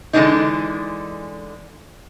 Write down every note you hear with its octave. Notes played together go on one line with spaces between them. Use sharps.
D3 E3 G#3 A#3 D4 D#4